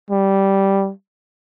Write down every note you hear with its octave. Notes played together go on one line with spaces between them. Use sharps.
G3